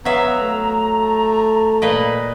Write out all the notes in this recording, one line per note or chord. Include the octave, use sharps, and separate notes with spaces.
F#3 B3 E5 F5 A#5
A3
A#2 B4 D#5